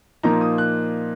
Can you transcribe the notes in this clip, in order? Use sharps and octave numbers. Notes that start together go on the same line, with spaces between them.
A#2 F3 A#3 D#4 A#5
D#6
F#6